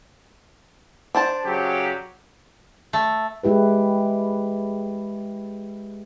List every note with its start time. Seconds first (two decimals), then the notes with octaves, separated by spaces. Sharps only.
1.15 D4 C5 A5
1.45 C#3 F#3 G4
2.93 A3
3.43 G#3 E4 G4 B4